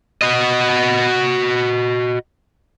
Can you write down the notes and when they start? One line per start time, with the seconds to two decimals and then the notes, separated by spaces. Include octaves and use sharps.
0.22 F#4 D#5